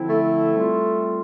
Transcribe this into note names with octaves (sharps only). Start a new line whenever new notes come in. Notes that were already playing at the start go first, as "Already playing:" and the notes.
Already playing: D3 F3 C4 E4
A3
G3 C4 F4